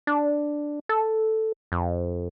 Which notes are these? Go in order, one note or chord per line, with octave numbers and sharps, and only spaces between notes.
D4
A4
F2